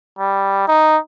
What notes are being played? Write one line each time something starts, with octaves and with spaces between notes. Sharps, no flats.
G3
D#4